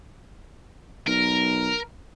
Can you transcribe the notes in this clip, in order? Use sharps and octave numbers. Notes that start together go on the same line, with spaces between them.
B1 A#4